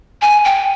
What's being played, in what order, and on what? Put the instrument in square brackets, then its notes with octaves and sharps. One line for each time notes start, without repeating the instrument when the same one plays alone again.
[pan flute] G#5
G5